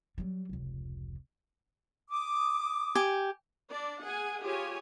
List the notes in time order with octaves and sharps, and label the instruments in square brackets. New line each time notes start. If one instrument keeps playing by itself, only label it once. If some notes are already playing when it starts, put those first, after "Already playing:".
[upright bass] F#3 G3
F1 C#2
[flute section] D6 D#6
[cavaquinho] G4 G#5
[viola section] D4 D5
G#4 F#5 G#5
F4 G4 G#4 C#5 G#5